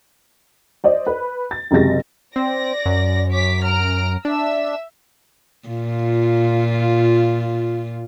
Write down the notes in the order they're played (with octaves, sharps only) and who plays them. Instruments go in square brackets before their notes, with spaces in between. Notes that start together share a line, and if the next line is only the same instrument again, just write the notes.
[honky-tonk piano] C5 D5 D#5
B4
A6
F#1 C3 F#3 G#3 A6 A#6
[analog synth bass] C4 [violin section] D5 A#6
[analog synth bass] F#2
[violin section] C#5 D6 B6
A#5 F6 D7
[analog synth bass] D4 [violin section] E5 E6
[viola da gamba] A#2 F4